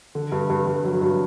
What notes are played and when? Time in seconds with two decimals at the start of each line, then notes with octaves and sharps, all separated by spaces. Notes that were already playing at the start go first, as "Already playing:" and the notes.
0.15 D3
0.32 G2
0.50 G2
0.67 G2
0.85 F#3
1.01 G2